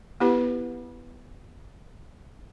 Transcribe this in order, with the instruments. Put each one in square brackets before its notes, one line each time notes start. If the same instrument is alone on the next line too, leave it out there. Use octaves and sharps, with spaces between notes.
[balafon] B3 E4 G4 B4